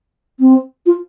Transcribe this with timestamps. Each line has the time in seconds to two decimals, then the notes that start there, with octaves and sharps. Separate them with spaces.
0.40 C4
0.86 F4